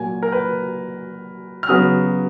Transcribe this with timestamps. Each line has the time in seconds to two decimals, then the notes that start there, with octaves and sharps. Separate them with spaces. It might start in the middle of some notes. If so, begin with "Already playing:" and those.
Already playing: A#2 F#3 A#3 G#5
0.23 A#4
0.32 B4
1.63 F6
1.69 C#3 F#3 B3 D#6